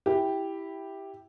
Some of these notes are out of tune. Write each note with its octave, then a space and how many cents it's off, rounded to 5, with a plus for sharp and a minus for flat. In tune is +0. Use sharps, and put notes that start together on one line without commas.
E4 +0 G4 +0